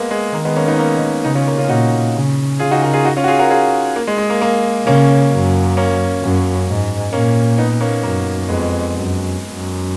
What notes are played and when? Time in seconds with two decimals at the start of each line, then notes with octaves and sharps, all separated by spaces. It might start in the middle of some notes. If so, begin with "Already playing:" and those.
Already playing: G#3 A#3 B3
0.11 G#3
0.34 D#3 A#3
0.45 G#3 B3
0.56 A#3 C#4
0.68 B3 D#4
0.79 A#3 C#4
1.24 C#3 B3 D#4
1.35 C#4 F4
1.47 A#3 C#4
1.58 C#4 F4
1.69 A#2 D#4 F#4
2.15 C#3
2.59 C#3 F4 G#4
2.71 D#4 F#4
2.83 F#4 A#4
2.93 F4 G#4
3.05 D#4 F#4
3.17 C#4 F4
3.24 F#4
3.28 F4 G#4
3.39 F#4 A#4
3.50 F4 G#4
3.96 A#3
4.07 G#3
4.18 G#3
4.30 A#3
4.41 A#3
4.87 C#3 A#3 C#4
5.32 F#2
5.77 A#3 C#4
6.22 F#2
6.68 G#2
7.13 A#2 A#3 C#4
7.58 B3 D#4
7.81 A#3 C#4
8.03 F#2 A#3
8.48 F2 G#3 B3
8.94 F#2
9.39 F#2